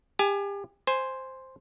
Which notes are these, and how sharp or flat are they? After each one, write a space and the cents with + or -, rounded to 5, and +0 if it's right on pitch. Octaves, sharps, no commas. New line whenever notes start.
G4 +35 G#5 +20
C5 +0 G#5 +0